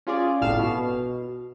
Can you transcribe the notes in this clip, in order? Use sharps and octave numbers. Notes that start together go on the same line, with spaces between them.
C#4 F4 G#4 D5
G1 C2 A2 F5 F6 E7
B2